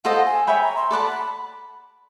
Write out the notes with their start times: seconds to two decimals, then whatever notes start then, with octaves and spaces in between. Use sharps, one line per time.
0.04 F4 A4 C5 D#5 F#5
0.26 G#5
0.47 C#5 E5 G5 G#5 B5
0.62 A#5
0.76 C6
0.91 A4 D5 F#5 A5 B5